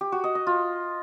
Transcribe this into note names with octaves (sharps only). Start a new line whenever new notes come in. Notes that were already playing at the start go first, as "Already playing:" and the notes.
G4
F#4
D#5
D#5
F4